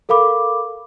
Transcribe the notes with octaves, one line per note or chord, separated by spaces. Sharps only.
A4 A#4 F5 B5 D6